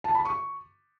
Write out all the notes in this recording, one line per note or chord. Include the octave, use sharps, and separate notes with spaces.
A5
B5
C#6